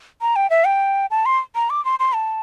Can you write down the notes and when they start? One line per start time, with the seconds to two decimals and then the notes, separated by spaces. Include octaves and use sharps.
0.21 A#5
0.36 G5
0.50 E5
0.66 G5
1.11 A5
1.26 C6
1.55 A#5
1.70 D6
1.85 C6
1.99 C6
2.15 A5